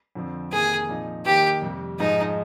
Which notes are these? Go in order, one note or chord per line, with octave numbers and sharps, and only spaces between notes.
F2 D3 F3 C4
F2 C3 D#3 A#3 G#4
A#2 F3 C4 D#4
D#3 A#3 D#4 G4
F2 C3 G3
G#2 F3 G#3 D#4